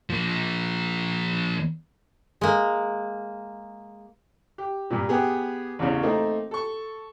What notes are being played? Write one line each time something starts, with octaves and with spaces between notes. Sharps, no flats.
F3 A#3
G#3 A#3
G4
G2 A#2
B3 G4 G#4
A1 E2 C#3
A3 A#3 C4 D#4
A4 C#6